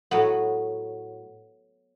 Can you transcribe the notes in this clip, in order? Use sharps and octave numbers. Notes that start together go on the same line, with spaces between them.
A2 F#3 B3